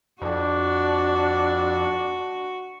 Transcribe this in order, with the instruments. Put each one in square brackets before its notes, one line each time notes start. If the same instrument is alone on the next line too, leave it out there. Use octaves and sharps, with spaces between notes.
[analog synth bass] F2 [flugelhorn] D4 [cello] F#4